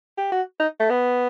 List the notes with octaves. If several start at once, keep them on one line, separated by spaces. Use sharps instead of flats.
G4
F#4
D#4
A3
B3